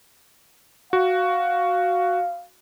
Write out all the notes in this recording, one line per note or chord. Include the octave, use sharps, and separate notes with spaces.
F#4 F5